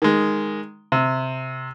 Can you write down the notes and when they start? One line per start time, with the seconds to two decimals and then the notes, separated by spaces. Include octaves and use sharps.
0.02 D#3 G#3
0.92 C3